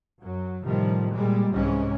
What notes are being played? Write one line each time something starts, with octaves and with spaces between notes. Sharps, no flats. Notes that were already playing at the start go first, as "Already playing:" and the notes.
F#2 F#3
A2 C3 D#3 F3 G3
A#2 G3 G#3
C2 G#2 C3 E3 G#3 C#4